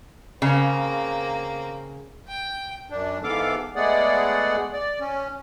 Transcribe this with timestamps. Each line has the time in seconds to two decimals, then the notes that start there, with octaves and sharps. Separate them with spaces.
0.42 C#3 A#3 C4
2.28 G5
2.90 F#2 D4
3.24 G#2 E3 B3 A4 F5 D6
3.76 G#3 A3 B3 G#4 D5 F#5
4.73 D5
5.00 C#4